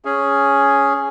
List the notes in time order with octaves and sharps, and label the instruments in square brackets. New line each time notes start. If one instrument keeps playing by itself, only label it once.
[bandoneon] C#4 G#4